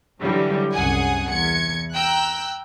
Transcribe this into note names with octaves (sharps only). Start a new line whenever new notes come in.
D3 E3 F#3 G3
C2 F#2 G#4 F#5 G#5 D#6
E2 G#6 C#7
G5 A#5 E6 F#6